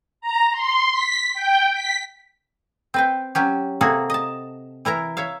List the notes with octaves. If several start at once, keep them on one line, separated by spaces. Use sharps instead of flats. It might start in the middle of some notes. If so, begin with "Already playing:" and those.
A#5
C6
B6
G5
B6
C4 B4 G5
F#3 C#4 G4
C3 A#3 F#4 G#4 A4
D#5 A5
E3 E4 A#4 A#5
C#5 E5 F5